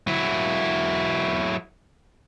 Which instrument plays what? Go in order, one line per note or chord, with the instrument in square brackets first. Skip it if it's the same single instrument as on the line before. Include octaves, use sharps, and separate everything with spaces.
[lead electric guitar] F#3 E4